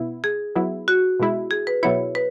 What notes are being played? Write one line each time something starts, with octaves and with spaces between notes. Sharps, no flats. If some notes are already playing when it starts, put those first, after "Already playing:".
Already playing: B2 B3 E4
G#4
F#3 B3 E4
F#4
B2 G#3 E4
G#4
B4
B2 F#3 B3 E4 C#5
B4